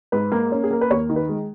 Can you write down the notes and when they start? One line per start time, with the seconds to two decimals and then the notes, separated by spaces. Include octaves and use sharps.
0.12 G#2 B4
0.32 A#3
0.52 C#4
0.64 G#4
0.71 A#3 A#4
0.81 B4
0.90 D#2 C#5
1.10 D#3
1.16 B4
1.29 G#3